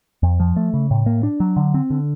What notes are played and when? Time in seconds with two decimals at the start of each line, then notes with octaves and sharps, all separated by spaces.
0.23 F2
0.40 F3
0.56 A3
0.74 C#3
0.91 A2
1.06 A#3
1.23 D4
1.40 F#3
1.57 D3
1.74 C4
1.90 D3